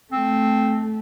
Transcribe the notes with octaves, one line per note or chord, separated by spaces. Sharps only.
A3 C4